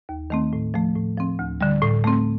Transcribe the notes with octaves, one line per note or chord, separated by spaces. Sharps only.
D#2
D#3 A3 C4
A2
F3 A3
A2
F3 C4
D2
D3 G3
A2
A3 C4